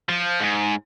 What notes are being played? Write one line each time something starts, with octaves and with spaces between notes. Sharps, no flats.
F3
G#2